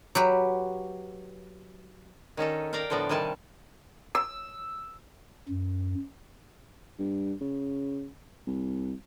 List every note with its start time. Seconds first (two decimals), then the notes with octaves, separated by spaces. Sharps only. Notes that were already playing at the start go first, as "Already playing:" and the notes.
0.15 F#3 G4 B4
2.37 D#3 C#4 D#4 A4
2.73 A#4 D5 F5 G5 A#5
2.90 A2 D3 F3 B3 D5
3.09 C3 D#3 G3 G#5 A5
4.15 E6
5.49 F#2
6.99 G2
7.41 C#3
8.47 C2